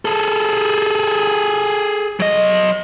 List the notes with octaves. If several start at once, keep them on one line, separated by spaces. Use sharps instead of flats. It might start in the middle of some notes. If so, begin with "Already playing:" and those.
G#4 A4
F#3 D#5